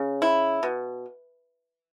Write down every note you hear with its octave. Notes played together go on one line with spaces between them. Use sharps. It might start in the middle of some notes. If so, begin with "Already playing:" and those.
Already playing: C#3
E4
B2